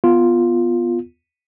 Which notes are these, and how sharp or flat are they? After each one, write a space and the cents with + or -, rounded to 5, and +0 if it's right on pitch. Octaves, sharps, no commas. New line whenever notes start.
B3 +0 F4 +0